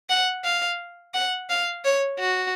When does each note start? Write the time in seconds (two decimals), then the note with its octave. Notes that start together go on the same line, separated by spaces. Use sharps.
0.10 F#5
0.44 F5
1.14 F#5
1.49 F5
1.85 C#5
2.19 F#4